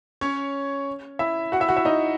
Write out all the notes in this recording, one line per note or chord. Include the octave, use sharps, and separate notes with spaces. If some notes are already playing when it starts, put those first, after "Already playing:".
C#4 C#5
E4 E5
F#4 F#5
E4 E5
F#4 F#5
E4 E5
D#4 D#5